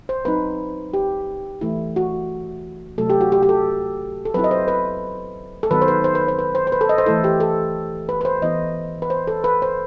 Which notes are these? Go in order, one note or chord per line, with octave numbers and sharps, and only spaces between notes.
C5
F#3 C4 D#4 B4
G4
E3 A3 E4
F#4
C3 F#3 A3 A4
G4
F#4
G4
G4
A4
A4
F#3 C4 E4 B4
D#5
C5
B4
A4
D#3 F#3 B3 D#4 B4
C5
B4
C5
B4
C5
B4
C5
C5
B4
A4
D#5
C5
E3 A3 E4 A4
G4
A4
B4
B4
C5
E3 B3 E4 D#5
B4
C5
A4
B4
C5